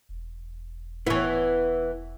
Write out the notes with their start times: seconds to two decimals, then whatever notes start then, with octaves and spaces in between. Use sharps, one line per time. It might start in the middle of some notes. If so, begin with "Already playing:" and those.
0.09 E1
1.07 E3 B3 E4 C#5